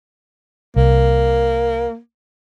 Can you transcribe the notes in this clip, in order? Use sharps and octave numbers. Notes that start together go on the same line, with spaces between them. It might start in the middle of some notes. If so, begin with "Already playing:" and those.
C2 A#3